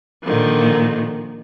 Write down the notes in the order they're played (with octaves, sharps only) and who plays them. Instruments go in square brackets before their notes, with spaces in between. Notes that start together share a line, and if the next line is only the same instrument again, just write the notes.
[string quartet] A#2 D3 D#3 F3